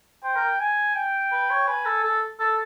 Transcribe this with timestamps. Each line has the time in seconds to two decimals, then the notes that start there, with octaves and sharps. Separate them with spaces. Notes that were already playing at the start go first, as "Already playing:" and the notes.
0.24 C5 G5
0.36 A#4
0.60 G#5
0.95 G5
1.32 B4
1.50 C#5
1.67 B4 G#5
1.85 A4
2.03 A4
2.40 A4